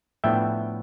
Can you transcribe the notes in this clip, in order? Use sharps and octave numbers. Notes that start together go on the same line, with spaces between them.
A2 F3 B3 D4 E5 G5